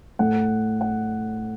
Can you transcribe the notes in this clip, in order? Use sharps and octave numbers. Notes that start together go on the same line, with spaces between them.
A2 A3 F#5
F#5